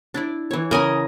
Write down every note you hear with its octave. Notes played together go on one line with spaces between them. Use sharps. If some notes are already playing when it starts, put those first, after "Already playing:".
D4 E4 D5
E3 C#5
C#3 A#4 D#5 G#5